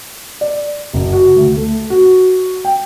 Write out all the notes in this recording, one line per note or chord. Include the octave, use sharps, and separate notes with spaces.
D5
F#1
F#4
D2
A3
F#4
G5